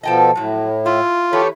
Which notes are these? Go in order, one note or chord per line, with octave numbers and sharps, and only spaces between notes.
B2 F3 A4 D#5 G5 A5
A2 F3 F#3
E4 F4
E2 E4 G4 A4 B4 C#5